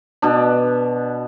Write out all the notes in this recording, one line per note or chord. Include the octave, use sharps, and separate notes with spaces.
B2 D4